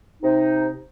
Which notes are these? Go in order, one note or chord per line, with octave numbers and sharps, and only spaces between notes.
C3 D#4